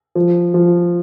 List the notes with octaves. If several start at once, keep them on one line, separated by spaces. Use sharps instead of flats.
F3
F3